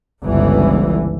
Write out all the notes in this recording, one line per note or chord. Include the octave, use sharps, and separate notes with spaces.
G1 C#2 E3